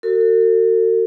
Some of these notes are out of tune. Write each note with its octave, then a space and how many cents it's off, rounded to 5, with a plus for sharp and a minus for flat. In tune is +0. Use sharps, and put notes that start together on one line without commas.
F#4 +5 A4 +45